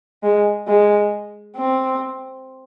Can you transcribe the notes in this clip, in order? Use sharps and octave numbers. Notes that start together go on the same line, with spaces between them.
G#3
G#3
C4